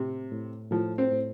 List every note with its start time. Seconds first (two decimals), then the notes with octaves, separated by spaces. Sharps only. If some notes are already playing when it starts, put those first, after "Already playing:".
Already playing: A2 C3
0.31 A2
0.71 A2 F3
0.98 C4
1.12 A2